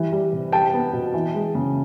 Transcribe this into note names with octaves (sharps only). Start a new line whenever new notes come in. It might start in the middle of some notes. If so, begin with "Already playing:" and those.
Already playing: E3 G3
G3
C3
G3 G5 A5
B3
B2
E3
G#3
C#3